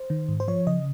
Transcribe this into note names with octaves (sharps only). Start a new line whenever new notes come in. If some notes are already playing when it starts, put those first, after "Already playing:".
Already playing: C5
D#3
G#2
C5
F3 C#5
C#3 D#5